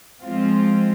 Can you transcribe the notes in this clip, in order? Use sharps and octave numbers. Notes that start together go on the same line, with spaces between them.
F3 G#3 C4 F4